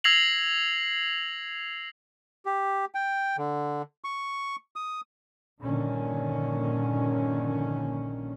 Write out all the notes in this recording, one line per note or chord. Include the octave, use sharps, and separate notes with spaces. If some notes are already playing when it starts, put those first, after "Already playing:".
E6 G#6 A#6 C7 F7 F#7
G4
G5
D3
C#6
D#6
A#1 G2 A#2 D3 D#3 C#4